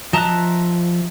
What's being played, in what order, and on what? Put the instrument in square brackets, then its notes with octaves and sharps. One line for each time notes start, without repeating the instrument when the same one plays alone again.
[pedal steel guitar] F3 E5 F#6 [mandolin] D#5 A5 A#5